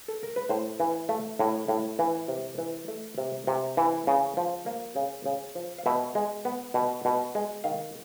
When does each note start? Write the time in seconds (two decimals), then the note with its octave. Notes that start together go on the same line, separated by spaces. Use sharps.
0.08 A4
0.23 A#4
0.36 B4
0.49 A2 C5
0.80 E3
1.09 A3
1.39 A2
1.68 A2
1.99 E3
2.28 C3
2.58 E3
2.88 A3
3.18 C3
3.47 C3
3.77 E3
4.07 C#3
4.37 F3
4.66 A#3
4.96 C#3
5.26 C#3
5.55 F3
5.79 F5
5.86 B2 E5
6.15 G#3
6.45 B3
6.74 B2
7.05 B2
7.35 G#3
7.64 D#3 F5